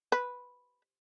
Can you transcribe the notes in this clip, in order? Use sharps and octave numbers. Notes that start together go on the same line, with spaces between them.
B4